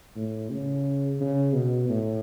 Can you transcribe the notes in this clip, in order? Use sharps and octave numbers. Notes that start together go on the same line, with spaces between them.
A2
C#3
C#3
B2
A2